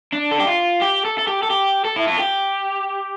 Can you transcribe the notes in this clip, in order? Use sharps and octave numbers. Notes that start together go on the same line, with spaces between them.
D4
A4
G4
F4
G4
A4
A4
G4
A4
G4
A4
E4
F4
G4